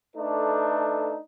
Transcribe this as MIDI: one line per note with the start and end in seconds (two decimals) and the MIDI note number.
0.16 1.17 57
0.16 1.17 62
0.16 1.17 63
0.16 1.17 69
0.16 1.17 71